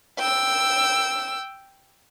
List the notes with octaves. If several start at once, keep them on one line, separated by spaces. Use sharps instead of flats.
G5 E6